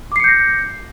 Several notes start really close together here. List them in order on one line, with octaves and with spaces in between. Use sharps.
D6 C7 C#7 G6 A#6